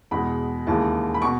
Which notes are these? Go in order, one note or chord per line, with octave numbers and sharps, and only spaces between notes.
E2 B2 G#3 B5
D#2 C#3 E3 G#3 A5
B5
B2 C#6